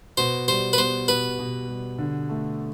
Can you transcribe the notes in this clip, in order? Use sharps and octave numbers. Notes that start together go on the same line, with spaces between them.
B2 C5
G3 C5
B4
B3 C5
B2 B4
B2
G3
D3
A3